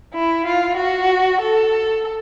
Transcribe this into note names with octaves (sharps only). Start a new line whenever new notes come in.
E4
F4
F#4
A4